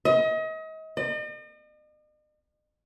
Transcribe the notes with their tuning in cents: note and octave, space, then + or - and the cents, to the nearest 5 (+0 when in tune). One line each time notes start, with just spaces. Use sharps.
D#5 +35
D#5 -45